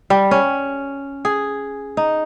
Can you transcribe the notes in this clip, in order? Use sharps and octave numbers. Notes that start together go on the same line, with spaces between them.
G3
C#4
G#4
D#4